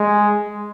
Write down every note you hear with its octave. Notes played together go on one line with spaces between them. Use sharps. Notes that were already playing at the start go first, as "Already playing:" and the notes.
Already playing: G#3